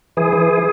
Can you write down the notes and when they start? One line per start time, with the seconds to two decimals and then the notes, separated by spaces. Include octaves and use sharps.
0.17 E3 G#4
0.33 E3